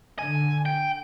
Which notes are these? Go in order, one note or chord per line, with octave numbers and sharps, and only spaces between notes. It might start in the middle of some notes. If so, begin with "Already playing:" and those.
D3 G#5
G5